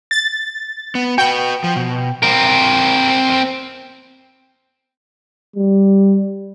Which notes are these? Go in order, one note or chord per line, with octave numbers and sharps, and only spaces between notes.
A6
B3
F#4 B4 G5
F3
B2
C4 A#4
G3